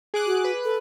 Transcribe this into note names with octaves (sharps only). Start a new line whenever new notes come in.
G#4 D6 F#6
F#4
B4
A4